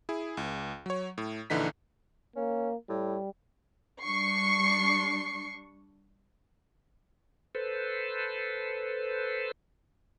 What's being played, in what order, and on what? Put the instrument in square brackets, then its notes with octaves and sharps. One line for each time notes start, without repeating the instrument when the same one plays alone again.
[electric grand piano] E4 G#4
C#2
F#3 C#5
A2
A#1 D3 E3 D#4 B6
[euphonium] A#3 [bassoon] C#4
[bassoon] A2 [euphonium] G3
[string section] G3 D4 C#6 C7 C#7
[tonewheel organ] A4 B4 C5